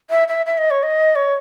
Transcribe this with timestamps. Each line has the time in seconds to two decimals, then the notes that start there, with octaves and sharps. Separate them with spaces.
0.10 E5
0.28 E5
0.46 E5
0.58 D#5
0.70 C#5
0.83 D#5
1.15 C#5